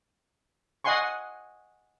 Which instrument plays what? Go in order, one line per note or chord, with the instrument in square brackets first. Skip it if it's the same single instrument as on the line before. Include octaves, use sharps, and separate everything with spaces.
[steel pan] D#5 F#5 G#5 C6 C#6